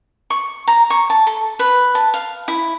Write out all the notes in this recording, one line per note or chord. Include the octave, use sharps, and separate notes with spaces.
C#6
A#5
C#6
A5
A4
B4
A5
F5
E4